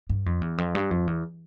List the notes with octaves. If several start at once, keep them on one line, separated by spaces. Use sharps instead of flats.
G2
F2
E2
F2
G2
F2
E2